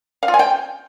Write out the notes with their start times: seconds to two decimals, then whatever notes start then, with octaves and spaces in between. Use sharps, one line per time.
0.23 F5
0.28 F4
0.34 G#5
0.39 G5